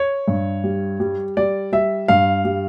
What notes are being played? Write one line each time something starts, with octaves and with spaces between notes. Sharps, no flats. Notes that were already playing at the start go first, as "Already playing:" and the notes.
Already playing: C#5
G2
G3
G3
G3 D5
G3 E5
G2 F5
G3